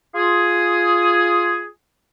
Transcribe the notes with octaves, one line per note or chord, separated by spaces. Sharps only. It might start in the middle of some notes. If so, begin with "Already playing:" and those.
F4 G#4